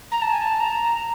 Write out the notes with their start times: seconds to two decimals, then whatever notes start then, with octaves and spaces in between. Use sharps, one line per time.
0.12 A#5
0.22 A5
0.32 G#5
0.42 A5
0.60 A#5